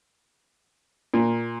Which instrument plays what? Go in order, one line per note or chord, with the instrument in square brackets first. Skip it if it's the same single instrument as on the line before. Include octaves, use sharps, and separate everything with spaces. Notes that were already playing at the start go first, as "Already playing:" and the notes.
[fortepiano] A#2